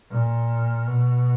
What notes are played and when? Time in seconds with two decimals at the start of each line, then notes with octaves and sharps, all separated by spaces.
0.11 A#2
0.87 B2